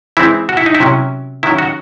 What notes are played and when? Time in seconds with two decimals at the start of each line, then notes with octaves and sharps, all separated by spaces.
0.17 E3 G#3 C4 E4
0.49 F#4
0.57 E4
0.66 D#4
0.75 E4
0.80 C3 F#3 C#4
1.43 D#3 F#3 C#4 E4
1.58 F#4